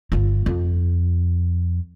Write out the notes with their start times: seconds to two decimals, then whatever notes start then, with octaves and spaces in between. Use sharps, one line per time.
0.12 G1 F4
0.46 F2